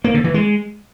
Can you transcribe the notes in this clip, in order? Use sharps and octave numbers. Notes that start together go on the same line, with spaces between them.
A#3
D3
E3
G#3